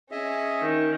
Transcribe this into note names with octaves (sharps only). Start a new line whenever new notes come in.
C#4 G#4 D#5 E5
D#3